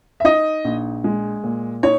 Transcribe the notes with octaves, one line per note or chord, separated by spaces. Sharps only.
E5
D#4 D#5
A#1
G#3
A#2
D#4 C#5